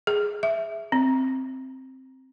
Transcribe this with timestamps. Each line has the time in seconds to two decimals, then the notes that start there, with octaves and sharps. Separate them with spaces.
0.07 G#4
0.43 E5
0.92 C4